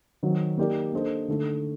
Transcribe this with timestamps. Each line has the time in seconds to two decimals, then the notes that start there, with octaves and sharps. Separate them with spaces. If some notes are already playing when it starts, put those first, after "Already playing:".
0.23 D#3 F#3 C4
0.58 A#3 D#4 G4 A#4 D5
0.93 A#3 D4 A4 C5 D#5
1.28 D3 A3 D#4 A4